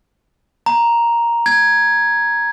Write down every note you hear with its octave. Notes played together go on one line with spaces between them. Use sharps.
A#5
G#6